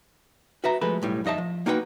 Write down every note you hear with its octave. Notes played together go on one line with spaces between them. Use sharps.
F#4 B4 E5 A#5
F3 G#3 A3 A4 B4
B1 A2 G3
F2 D#4 D#5 E5 A5
F3
A#3 D#4 F#4 B4 C5 G5